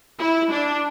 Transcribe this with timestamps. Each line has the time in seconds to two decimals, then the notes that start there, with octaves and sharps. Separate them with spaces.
0.19 E4
0.51 D4